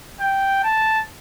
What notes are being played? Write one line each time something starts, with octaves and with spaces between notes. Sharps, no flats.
G5
A5